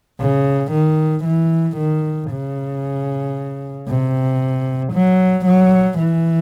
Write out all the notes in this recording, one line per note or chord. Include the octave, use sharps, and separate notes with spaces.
C#3
D#3
E3
D#3
C#3
C3
F#3
F#3
E3